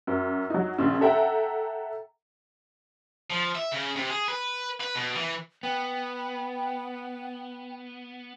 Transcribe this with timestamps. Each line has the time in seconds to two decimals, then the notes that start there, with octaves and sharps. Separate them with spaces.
0.07 F#2
0.50 F#3 D#4
0.78 A#1 C#3
1.01 A4 E5 F#5 G5 A#5
3.30 F3
3.55 E5
3.72 C#3
3.96 C3
4.09 G#4
4.28 B4
4.81 B4
4.95 B2
5.16 E3
5.63 B3 G5